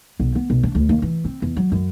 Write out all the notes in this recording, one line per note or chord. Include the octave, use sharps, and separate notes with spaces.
B1
B3
B1
D4
D2
D#2
E3
C4
E2
F#3
F#2